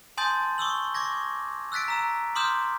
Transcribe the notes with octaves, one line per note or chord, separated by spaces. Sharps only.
G#5 A5 C6 D#6 G6 A6
C#6 D#6 E6 F#7
C#6 D6 G#6 A#6
E6 F#6 A6 B6 D7
A#5 E6 E7
C6 D6 D#6 F6 G6 E7